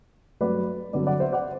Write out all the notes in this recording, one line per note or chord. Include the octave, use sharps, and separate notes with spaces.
G2 F#3 A3 B4 D5
G2 D3 F#3 B3 B4 D5
D5 F#5
C5 E5
D5 F#5